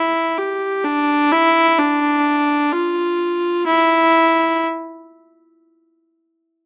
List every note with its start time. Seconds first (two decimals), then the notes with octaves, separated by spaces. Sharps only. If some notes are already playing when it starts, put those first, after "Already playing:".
Already playing: E4
0.38 G4
0.84 D4
1.32 E4
1.78 D4
2.72 F4
3.66 E4